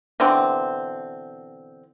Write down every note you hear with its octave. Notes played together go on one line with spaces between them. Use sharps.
B2 D3 E3 C4